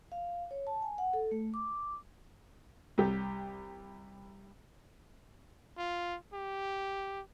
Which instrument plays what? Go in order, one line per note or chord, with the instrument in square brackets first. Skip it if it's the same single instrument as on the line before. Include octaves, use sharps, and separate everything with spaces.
[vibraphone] F5
C#5
A5
G#5
F#5
A4
A3
D6
[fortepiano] C2 G4
[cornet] F4
G4